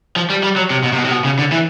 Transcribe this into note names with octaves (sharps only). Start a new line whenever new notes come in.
F3
G3
G3
F#3
C3
B2
C3
B2
C3
B2
C#3
D3
E3